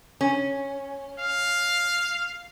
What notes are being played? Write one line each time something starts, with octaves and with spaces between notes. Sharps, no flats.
C#4
F5